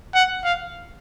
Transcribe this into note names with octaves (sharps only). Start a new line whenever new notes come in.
F#5
F5